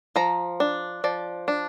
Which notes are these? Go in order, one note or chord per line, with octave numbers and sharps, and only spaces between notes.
F3 A#5
D4
F3 D5
D4